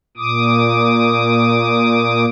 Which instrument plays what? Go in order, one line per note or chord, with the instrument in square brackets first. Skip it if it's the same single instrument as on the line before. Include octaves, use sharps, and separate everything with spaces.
[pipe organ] A#2 D6 D#6